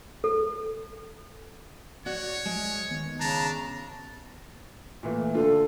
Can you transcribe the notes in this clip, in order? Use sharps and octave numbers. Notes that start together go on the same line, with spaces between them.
A4
F#4 C#5 D5 F#5
G#3
D#3 B3
C#3 D4 A5 A#5
A#2 E3 A3
D3 D4 F4 A4